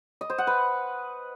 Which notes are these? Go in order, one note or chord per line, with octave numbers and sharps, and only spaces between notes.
D#5
C5
F#5
B4